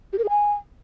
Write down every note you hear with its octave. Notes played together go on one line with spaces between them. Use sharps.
G4
A#4
G#4
G#5